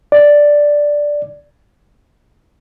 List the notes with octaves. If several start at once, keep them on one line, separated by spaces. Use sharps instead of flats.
D5